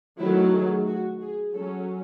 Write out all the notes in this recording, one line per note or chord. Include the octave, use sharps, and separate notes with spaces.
D#3 F#3 A3 E4
G#4
F#4
G#4
F#3 C#4 A4